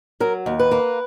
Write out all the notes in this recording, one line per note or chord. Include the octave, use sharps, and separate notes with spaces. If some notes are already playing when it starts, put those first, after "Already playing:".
F#3 A#4
D#2
B4
A#3